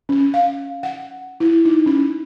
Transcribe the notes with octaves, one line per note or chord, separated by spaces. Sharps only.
C#4
F5
F#5
E4
D#4
C#4